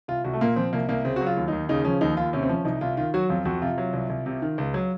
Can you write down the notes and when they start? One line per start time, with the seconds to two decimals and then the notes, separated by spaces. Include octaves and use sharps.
0.08 C2 F4
0.24 C2 F#4
0.34 A3
0.41 A#2 A#3
0.56 F3 C4
0.73 C2 A#3
0.89 C2 A#3
1.05 C#3 C4
1.16 F#3 F#4
1.26 F4
1.37 D#2
1.48 D#2 D#4
1.69 C#3 D#4
1.85 F3 C#4
2.01 D#2 D#4
2.17 D#2 F4
2.33 C3 C#4
2.43 C4
2.49 F3 C#4
2.65 C2 D#4
2.81 C2 F4
2.97 D#3 F4
3.14 F#3 F#4
3.29 F2 F4
3.45 F2 F#4
3.62 C3 F4
3.78 F#3
3.93 C2
4.10 C2
4.26 C3
4.42 D#3
4.58 C#2
4.74 F#3